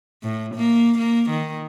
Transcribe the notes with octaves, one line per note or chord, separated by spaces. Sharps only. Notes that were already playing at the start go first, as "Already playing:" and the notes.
A2
A#3
A#3
D#3